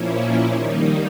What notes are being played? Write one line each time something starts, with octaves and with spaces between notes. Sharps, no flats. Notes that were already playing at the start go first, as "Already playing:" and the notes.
Already playing: A#2 F3 A#3 C#4 E4
D#3 G3 A#3 D#4